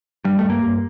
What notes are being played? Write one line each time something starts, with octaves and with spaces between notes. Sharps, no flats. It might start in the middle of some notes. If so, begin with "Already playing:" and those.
G2 G3
G2 A3
A#3
G2